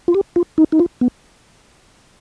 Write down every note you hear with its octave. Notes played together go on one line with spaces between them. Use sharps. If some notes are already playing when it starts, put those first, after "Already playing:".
F4
G4
F4
D#4
D#4
F4
B3